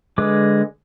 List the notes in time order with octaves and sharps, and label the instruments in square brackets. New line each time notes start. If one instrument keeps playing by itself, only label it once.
[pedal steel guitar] D3 G#3 B4 D6